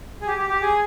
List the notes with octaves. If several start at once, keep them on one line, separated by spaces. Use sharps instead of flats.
G#4
G4
G4
G4
G#4